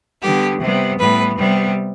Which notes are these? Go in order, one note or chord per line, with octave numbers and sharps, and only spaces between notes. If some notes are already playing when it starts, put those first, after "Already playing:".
D3 G3 B3 G4
C3 G3 B3
A2 G3 B3 B4
C3 G3 B3